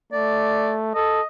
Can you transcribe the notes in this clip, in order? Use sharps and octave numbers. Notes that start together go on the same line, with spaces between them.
A3 D5
A4 D#5